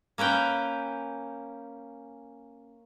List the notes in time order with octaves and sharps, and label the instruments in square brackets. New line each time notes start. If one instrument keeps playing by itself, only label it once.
[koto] A#3 C#4 B4 G5